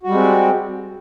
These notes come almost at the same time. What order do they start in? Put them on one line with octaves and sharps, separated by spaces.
F#4 G3 G#3 C4